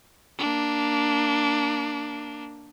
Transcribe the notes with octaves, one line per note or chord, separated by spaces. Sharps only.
A#3 D4